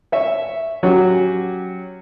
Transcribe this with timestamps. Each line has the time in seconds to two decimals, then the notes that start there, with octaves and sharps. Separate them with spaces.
0.12 C#5 E5
0.83 F#3 C#4 F#4 G4